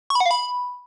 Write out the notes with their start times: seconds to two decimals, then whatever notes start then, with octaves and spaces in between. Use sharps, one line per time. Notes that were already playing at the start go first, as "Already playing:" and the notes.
0.10 C#6
0.15 B5
0.20 F#5
0.26 F5
0.31 B5